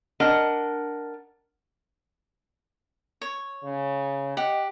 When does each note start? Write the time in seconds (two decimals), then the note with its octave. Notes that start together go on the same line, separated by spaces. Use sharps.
0.20 D4 A#4 D#5 F#5
3.22 C#5
3.63 C#3
4.37 G4 D#5 F#5